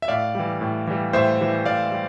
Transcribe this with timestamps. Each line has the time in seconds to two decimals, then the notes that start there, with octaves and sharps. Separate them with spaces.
0.02 E5
0.08 A2 D5 F5
0.35 E3 G3
0.61 A2
0.87 E3 G3
1.13 A2 C5 E5
1.40 E3 G3
1.66 A2 D5 F5
1.92 G3